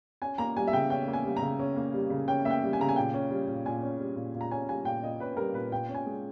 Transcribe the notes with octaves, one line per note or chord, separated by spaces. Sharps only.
C#4 G#5
A#3 A#5
G3 G#5
E5
C#3 G5
C#4 G5
A#3
G#5
G3
A#5
C#3
C#4
A#3
G3
C#3
C#4 G5
A#3 E5
G5
G3
G#5
C#3 A#5
G#5
A#2 G5
C#4
G3
A#2
A#2 G#5
C#4
G3
A#2
A#2
A#5
C#4 G#5
G3 G#5
A#2 G5
A#2 D#5
C#4 B4
G3 A#4
A#2 B4
A#2 G5
C#4
G#5
G#3